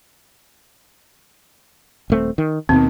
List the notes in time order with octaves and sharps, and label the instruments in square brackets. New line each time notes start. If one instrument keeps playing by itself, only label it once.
[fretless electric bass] D#1 A3 C4
D#3
[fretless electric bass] D#2 B2 D#3 [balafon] C4